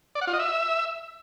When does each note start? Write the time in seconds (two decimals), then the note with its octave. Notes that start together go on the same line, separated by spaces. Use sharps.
0.15 D5
0.21 F#5
0.27 F4
0.33 D#5
0.39 E5